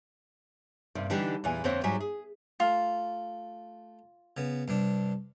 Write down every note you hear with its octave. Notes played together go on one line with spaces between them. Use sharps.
G2 C3 A#3
D3 E3 G3 D4 D#4 G4
E2 A#2 E3 G#5
F2 D3 C4 C5 C#5 E5
G#2 F#3 G3 G4 E5 G#5
G#4
A3 F4
C#3 B3
G2 C3 D4